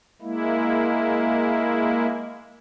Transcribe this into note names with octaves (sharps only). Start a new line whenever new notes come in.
G#3 A#3 E4